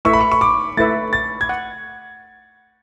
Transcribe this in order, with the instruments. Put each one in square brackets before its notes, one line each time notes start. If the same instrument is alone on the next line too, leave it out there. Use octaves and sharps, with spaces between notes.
[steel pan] A3 E4 B4 E5 [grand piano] C#6
[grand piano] B5
C#6
C#6
D6
[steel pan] A3 E4 B4 E5 [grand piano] A6
[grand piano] A6
G#6
[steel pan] F#5